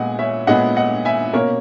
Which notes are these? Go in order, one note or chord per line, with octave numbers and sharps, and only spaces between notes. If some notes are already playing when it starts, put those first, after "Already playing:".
Already playing: A#2 G#3 B3 D#5 F#5 G#5
C#5 E5
A#2 G#3 B3 D#5 F#5
D#5 F#5
E5 G#5
B2 A#3 C#4 A#4 C#5